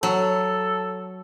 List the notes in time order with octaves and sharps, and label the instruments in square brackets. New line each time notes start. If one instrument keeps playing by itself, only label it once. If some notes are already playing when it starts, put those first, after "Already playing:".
[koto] F#3 [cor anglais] A4